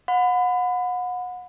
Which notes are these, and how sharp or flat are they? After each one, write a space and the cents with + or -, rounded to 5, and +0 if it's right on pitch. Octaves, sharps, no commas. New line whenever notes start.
F#5 -35 B5 +30